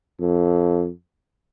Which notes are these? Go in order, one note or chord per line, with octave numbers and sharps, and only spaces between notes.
F2